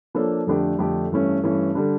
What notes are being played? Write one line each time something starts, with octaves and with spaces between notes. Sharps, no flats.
F3 A#3 D4 A4 C#5
F2 D3 A3 D4 G4
F2 D3 A3 D4 G4
G2 E3 A3 C#4
G2 E3 A3 C#4
D3 G3 D4